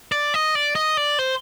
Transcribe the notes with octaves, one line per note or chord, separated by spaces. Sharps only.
D5
D#5
D5
D#5
D5
C5